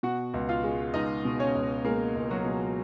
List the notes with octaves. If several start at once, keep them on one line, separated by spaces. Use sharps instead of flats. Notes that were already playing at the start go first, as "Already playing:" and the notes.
B2 F#4 F#5
C#2
F4 F5
G#3
C#2 D#4 D#5
B2
C#4 C#5
C#2
G#3 A#3 A#4
C#2
F#3 F#4
B2